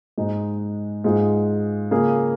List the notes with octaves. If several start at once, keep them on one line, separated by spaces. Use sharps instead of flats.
G#2 G#3 D#4
G#2 G#3 F4 G#4
C#3 A#3 F4 G#4